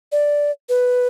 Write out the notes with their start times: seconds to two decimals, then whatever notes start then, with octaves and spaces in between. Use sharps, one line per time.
0.12 D5
0.69 B4